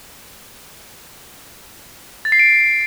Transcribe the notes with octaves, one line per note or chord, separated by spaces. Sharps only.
A6
C7
D7